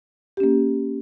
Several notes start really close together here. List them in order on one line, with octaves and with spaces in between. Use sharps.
G4 C#4 A#3